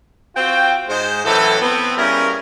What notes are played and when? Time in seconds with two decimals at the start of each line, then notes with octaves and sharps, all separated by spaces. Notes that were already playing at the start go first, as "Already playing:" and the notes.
0.35 C4 F4 F#4 G5
0.88 G#2 G#3 C5
1.24 F#2 A2 E3 F#3 A4
1.61 B3 C4
1.97 G3 A#3 C#4 E4 G#4 A#4